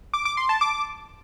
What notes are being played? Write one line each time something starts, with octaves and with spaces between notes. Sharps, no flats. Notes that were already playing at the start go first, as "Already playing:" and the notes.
D6
D6
C6
A5
D6